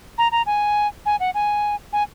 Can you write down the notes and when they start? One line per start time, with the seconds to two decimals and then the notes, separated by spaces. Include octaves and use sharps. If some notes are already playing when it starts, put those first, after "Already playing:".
0.18 A#5
0.32 A#5
0.46 G#5
1.06 G#5
1.20 F#5
1.34 G#5
1.93 G#5